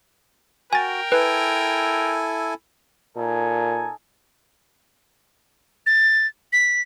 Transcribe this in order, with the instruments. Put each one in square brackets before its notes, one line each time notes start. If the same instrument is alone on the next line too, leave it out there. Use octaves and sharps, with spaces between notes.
[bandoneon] F#4 [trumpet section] A#4 G5 [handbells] G#5 A6
[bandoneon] E4 A4 G#5 [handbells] B4
[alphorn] A#2 [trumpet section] D#4 A4 G#5
[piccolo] A6
B6